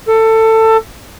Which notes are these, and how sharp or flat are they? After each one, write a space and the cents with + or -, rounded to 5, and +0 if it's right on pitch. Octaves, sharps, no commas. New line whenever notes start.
A4 +20